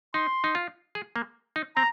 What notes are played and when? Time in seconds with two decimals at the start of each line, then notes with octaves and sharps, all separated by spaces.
0.14 D#4 C6
0.44 D#4
0.55 F4
0.95 G#4
1.16 A#3
1.56 D#4
1.76 C4 A#5